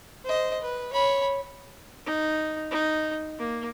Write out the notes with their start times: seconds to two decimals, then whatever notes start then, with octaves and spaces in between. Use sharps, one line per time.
0.24 C5 D#5
0.62 B4
0.93 C#5 B5
2.06 D#4
2.72 D#4
3.39 A#3